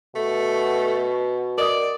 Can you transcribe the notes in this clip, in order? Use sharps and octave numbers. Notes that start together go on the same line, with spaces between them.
B2 A3
A#4 D5 D#5 D#6